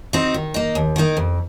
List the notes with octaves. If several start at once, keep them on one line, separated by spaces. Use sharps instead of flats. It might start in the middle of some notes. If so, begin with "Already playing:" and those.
C4 D#4 F#4
D#3
A#3 D#4
D#2
D#3 A#3 D#4
F2